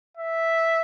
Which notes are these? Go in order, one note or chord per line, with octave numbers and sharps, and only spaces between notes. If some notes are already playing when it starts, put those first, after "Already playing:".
E5